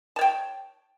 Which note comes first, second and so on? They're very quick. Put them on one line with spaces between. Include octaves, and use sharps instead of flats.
A5 C#5 G5